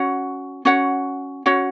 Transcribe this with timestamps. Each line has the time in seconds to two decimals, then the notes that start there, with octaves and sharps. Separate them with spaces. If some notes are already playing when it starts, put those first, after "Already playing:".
Already playing: C#4 F#4 C#5 F#5
0.65 C#4 F#4 C#5 F#5
1.46 C#4 F#4 C#5 F#5